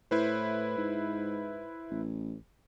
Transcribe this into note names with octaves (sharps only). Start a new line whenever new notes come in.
A2 E4 B4 C5
G#2
A1